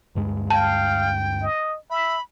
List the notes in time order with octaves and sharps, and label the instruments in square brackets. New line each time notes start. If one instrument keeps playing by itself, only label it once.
[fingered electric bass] D2 G2 G#3
[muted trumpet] F5 [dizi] G5 [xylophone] A5
[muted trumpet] D#5
[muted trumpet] E5 [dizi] B5